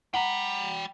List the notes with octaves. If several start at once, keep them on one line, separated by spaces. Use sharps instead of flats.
F#5 G5 A#5 B5